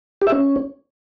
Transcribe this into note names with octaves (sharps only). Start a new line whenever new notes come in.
G4
E5
C#4